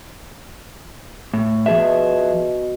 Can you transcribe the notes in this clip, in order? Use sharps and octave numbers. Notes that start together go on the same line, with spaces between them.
A2
B2 F3 G#4 E5